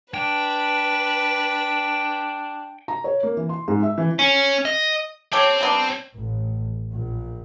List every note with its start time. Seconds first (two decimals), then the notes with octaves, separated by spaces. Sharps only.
0.14 D4 B4 G5
2.88 A#5
3.04 C#5
3.23 A#3
3.37 E3
3.49 C6
3.68 G#2
3.83 E5
3.98 E3
4.19 C#4
4.65 D#5
5.33 C4 G4 A4 C#5 G5
5.61 G3 B3 D4
6.16 A1
6.90 A#1